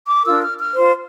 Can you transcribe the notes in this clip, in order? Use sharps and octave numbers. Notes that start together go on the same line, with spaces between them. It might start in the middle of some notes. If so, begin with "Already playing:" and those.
D6
D4 F4 A#4 E6
F6
F6
F4 C5